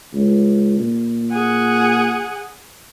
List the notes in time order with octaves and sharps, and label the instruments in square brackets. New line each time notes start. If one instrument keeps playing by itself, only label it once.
[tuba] C#2
A#2
[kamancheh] G#4 F#5